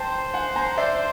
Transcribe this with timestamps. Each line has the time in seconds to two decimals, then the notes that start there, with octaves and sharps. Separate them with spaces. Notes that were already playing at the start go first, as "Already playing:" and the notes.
Already playing: C5 G5 A5 A#5
0.34 F#5 G#5
0.56 G#5 A#5
0.78 D5 E5